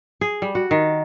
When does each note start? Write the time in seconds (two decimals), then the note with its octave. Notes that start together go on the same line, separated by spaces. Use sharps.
0.21 G#4
0.42 G3
0.55 F#4
0.71 D#3